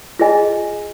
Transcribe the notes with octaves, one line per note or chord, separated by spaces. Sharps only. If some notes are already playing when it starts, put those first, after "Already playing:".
F4 G#4 D#5 G#5